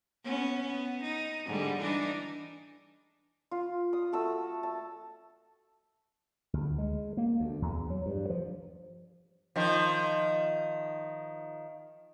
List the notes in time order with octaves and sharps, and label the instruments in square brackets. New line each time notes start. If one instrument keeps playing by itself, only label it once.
[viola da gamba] B3 C#4
B3
D#4
G#2 D3 G3
E3 D4 D#4
[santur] F4
D#6
A3 F#4 A4 E6
A5
[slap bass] D2
G#3
A#3
D2
E2
F#3
G2
F3
[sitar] D#3 F3